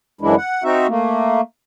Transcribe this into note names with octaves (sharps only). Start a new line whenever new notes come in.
F#2 C#3 E3 G#3 D4 E4
F#5
C4 D#4 F#4 E5
A3 A#3